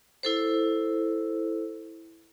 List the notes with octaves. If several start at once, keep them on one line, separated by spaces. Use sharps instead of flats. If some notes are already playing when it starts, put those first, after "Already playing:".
E4 A4 C5